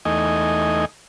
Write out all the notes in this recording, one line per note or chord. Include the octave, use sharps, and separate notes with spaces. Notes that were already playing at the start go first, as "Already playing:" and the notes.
E2 A3 D#4 D#5 G#5